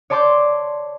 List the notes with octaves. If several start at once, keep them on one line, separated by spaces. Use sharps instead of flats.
C#5 D5 A5 C6 D6 G6